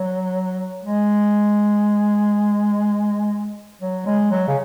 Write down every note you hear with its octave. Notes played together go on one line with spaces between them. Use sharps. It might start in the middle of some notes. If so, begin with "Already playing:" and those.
Already playing: F#3
G#3
F#3
G#3
F#3
C#3